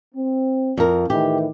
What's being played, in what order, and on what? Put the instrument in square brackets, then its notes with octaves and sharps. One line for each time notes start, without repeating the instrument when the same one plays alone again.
[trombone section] C4
[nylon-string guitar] F2 A#4
[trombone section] A2 D#3 E3 [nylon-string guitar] G4